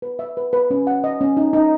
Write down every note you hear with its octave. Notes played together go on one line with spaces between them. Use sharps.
B4
E5
B4
B4
C#4
F#5
D#5
C#4
D#4
D#4